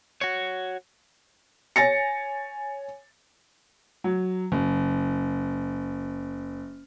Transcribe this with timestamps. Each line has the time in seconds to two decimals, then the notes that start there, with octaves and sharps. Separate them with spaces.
0.21 F#4 C#5
1.76 C#5 G#5 A6 A#6 C#7
4.04 F#3
4.52 F#1